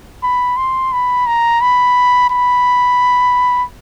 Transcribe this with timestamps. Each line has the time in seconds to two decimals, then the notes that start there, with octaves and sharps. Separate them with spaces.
0.23 B5
0.57 C6
0.93 B5
1.27 A#5
1.61 B5
2.30 B5